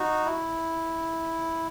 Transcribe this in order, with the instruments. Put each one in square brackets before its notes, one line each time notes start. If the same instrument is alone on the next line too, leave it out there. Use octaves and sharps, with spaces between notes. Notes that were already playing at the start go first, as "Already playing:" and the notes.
Already playing: [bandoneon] D#4 F#4
E4